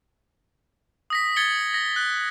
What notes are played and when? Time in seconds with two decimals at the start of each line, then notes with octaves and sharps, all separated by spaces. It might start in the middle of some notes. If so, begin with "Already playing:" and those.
1.10 D#6 A#6 B6
1.36 G#6 A6 C#7 G7
1.74 A#6
1.96 F#6